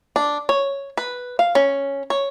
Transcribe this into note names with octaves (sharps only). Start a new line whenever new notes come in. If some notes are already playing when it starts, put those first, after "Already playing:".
D4
C#5
B4
F5
C#4
C#5